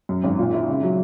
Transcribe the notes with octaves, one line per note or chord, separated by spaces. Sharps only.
F#2
G#1
A#2
E4
C#3
F#3